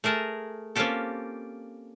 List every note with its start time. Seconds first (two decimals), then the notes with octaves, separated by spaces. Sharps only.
0.04 A3 G#4 A#4 A5
0.76 A#3 C4 C#4 F4 G4 A4